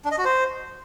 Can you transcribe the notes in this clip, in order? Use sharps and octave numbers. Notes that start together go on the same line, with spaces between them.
D4
D#5
F#4
C5